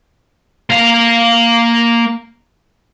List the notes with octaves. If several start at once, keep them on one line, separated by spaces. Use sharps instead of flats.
A#3 F5